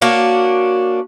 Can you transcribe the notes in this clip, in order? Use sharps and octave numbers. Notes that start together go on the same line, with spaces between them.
A#3 C#4 D4 F#4